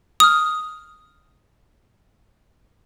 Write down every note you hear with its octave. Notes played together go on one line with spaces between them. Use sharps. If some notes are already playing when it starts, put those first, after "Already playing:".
D#6 F6